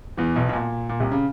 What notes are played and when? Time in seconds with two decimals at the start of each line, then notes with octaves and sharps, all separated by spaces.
0.17 E2 E3
0.36 B1 B2
0.49 B2
0.53 A#2
0.89 A#2
1.00 C2 C3
1.12 C#3